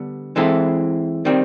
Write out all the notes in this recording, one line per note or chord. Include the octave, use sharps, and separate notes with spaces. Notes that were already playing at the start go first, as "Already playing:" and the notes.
Already playing: D3 G3 B3
E3 G#3 C4 E4 A4
D#3 G3 C4